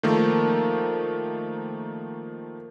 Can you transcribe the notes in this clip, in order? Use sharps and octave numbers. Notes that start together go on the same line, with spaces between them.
D#3 F3 A3 A#3